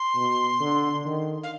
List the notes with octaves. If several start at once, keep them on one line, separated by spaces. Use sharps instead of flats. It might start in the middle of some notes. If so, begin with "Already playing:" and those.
Already playing: C6
B2
D3
D#3
F5